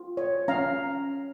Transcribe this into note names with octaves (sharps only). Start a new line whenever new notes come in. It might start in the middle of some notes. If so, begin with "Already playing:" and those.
Already playing: F4
C#5
C#4 F5 A#5